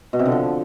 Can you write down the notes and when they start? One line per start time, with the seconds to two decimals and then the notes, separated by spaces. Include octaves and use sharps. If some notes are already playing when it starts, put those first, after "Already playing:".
0.13 B2
0.19 C3
0.26 D3
0.32 F3